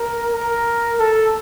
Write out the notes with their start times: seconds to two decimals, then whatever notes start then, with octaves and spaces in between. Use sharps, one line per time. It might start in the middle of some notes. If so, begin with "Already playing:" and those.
Already playing: A#4
0.34 A#4
0.99 A4